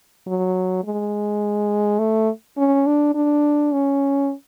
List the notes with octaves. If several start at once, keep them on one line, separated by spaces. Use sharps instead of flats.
F#3
G#3
A3
C#4
D4
D4
C#4